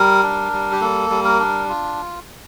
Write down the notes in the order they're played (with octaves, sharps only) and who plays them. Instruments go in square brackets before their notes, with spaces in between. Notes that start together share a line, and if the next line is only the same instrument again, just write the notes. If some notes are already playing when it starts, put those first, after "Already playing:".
Already playing: [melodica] G3 A#4
D4
G3
G4
A#3 A4
G3
A#4
D4
F4